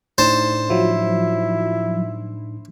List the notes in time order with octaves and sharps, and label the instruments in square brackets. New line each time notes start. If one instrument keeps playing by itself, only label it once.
[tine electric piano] A2 D4 D#4 [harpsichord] C5 A5
[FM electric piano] F3 F#3 [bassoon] E4